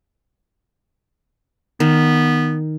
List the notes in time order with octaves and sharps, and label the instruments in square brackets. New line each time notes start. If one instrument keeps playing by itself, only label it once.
[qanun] D#3 [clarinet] B3